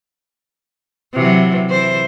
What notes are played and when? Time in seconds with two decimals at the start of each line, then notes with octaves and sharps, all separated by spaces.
1.14 C3 E3 F#3
1.69 E3 C5